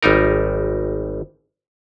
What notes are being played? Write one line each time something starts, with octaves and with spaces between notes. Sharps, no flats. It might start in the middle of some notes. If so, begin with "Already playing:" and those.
G#1 G3 D#4 A#4